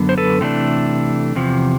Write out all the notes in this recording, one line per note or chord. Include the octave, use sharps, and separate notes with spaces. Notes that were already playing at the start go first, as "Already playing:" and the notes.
Already playing: F#2 D3 F#3 B3
C5
A4 B4
C3 E3 A3 D4
E2 C3 F3